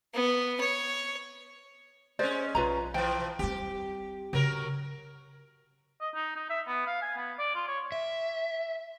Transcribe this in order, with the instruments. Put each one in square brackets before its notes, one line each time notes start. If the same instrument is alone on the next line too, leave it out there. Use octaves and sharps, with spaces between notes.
[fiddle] B3
C#5
[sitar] G#3 C#4 [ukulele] C5 D5
[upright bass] B1 [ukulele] F4 B4 A#5
[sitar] E3 F3 [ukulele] G5
[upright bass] G3 C4 [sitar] G4
[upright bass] C#3 [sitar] F#3 A#4
[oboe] D#5
D#4
D#4
E5
B3
F5
G#5
B3
D5
F4
C#5
[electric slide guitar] E5